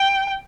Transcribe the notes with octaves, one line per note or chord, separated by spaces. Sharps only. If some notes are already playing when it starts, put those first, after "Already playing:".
Already playing: G5